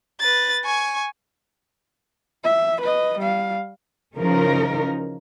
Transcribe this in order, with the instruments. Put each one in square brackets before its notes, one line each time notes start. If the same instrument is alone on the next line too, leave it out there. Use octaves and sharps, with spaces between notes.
[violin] B4 A6
G#5 C#6
[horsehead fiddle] E5
B4 D#5
G3 F5
[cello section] C#3 E3 F3 C#4 D#4 A#4